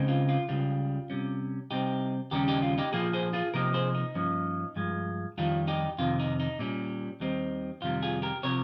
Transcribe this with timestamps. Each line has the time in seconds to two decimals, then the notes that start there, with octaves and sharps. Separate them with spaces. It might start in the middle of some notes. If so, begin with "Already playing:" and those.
Already playing: C#2 C#3 G#3 C4 D#4
0.08 F4
0.29 F4
0.49 C#2 C#3 G3 F4
1.10 C3 G3 C#4
1.71 C3 G3 C4 D#4 G4
2.31 D#2 C#3 G3 C#4 G4 A#4
2.48 D#4 G4
2.62 F4
2.78 D#4 G4
2.93 A#2 F3 A#3 F4 G#4
3.13 G#4 C5
3.33 F4 G#4
3.54 C3 F3 A#3 D#4 G4 A#4
3.74 G#4 C5
3.95 D#4
4.15 G2 F3 A#3 C#4
4.76 G2 F3 G#3
5.38 F2 D#3 G3 F4
5.67 D#4 G4
5.98 F2 C3 D#3 F4
6.20 D#4
6.40 D#4
6.59 A#2 G3 C#4
7.20 D#2 D#3 G3 C4 D#4
7.82 F2 C3 D#3 G3 F4
8.03 F4 G#4
8.22 G4 A#4
8.43 C3 F3 A#4 C#5